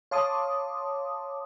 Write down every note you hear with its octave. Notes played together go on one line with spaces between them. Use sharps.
C#5 F5 A5 C6 D6 D#6